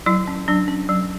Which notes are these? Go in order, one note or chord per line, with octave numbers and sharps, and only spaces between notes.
F#3 E4
C#4
F#3 D4
C#4
F#3